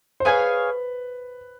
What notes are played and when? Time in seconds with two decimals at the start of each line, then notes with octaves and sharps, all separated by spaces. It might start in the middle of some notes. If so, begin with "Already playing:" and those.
0.20 C5
0.25 G#4 B4 C#5 F5 G#5